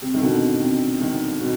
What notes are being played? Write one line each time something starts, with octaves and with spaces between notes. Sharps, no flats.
C3
D#3
B2 D3
C3
C3
C3 D#3
B2